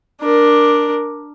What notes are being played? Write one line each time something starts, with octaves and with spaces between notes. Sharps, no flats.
D4 A#4